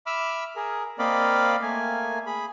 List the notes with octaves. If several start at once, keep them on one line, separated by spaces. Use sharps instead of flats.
E5 B5 D6 E6 F6
G#4 A#4
A#3 C4 D5 D#5 F5 B5
A3 A#3 G#5
G#4 B5